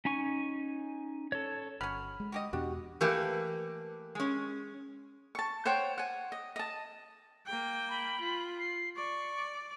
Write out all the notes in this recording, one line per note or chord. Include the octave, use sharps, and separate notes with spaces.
C#4 D#4 G#5 C#6
A4 C#5
G1 F#3 C#4 B5 F6
G#3
F#4 G4 D#5
E2 B2 B3 D4 F#4 G4
E3 A3 A#3 G4 B4
G#3 C#4
A5 C#6
C5 C#5 F#5 G5
F#5 G#5
D#5
D#5 A5
A#3 G5
B5
F4
C7
D5 C#6